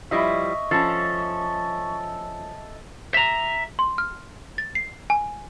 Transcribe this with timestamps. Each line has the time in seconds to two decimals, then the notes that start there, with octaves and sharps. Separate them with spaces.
0.11 F3 G3 E4 D#5 E5 C#6
0.71 F3 C#4 A4
3.14 E5 A#5
3.79 C6
3.98 F6
4.58 A6
4.75 C7
5.10 G#5